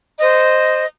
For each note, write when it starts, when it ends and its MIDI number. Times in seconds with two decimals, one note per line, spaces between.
0.19 0.84 72
0.19 0.84 75